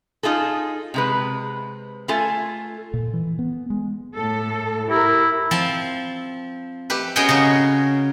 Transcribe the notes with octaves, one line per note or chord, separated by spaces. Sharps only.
D#4 F4 G#4 A4
C3 G#3 B4
A3 F4 A4 G#5
A#2
E3
B3
G#3
A2 A4
E4 G4 A#4
F3 C4 A5
A3 G4 B4
B3 C#4 F#4 G#4 D#5 G5
C#3 A#4 C#5